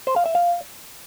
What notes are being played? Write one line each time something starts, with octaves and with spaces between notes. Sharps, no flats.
C5
F5
E5
F5